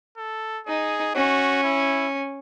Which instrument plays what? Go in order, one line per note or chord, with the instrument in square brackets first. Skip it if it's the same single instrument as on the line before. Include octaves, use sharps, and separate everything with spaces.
[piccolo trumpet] A4
[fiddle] D#4 [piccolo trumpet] G#4
[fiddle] C#4 [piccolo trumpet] F#4
[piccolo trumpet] E4